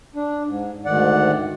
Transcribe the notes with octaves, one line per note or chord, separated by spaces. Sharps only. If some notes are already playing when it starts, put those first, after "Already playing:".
D4
G#2
D2 G#2 D#3 D5 F#5